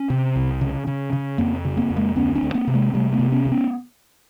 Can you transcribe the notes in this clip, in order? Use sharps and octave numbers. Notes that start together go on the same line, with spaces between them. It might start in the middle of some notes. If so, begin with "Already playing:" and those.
Already playing: C#4
C3
C2
C#3
C#3
C#3
F2 A#3 C4
C#3
A#3 C4
F2
G#3 A#3
D2 B3 C#4
C4 D4
D2
A#3 C4
C3
G#3 A#3
C3 G3 A3
A3 B3
C3
B3 C#4
D2
B3 C#4